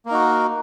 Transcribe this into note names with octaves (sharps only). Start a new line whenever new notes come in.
A#3 D#4 F#4 A#4